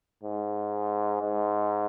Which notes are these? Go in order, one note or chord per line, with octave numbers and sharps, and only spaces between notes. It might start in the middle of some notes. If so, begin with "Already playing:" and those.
G#2
G#2